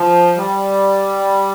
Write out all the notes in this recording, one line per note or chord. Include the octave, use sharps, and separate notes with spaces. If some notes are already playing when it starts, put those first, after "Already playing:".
Already playing: F3
G3